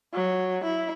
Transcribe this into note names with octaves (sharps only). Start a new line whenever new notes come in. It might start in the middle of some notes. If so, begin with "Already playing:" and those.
F#3
E4